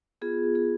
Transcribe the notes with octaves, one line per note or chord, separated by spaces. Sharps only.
B3 F4 G#4
G#4